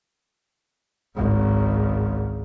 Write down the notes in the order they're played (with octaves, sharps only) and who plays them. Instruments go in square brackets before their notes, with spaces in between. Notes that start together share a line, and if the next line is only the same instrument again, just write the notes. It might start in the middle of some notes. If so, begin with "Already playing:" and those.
[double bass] G#1 C#2